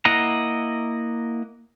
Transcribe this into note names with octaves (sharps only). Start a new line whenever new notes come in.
A#3 E4 D#5 F#5 A#5